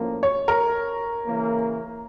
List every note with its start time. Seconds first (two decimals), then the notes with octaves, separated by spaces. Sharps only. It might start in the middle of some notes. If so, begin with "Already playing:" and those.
Already playing: A2 F3 A#3 C#4
0.23 C#5
0.48 A#4
1.25 C#3 E3 A#3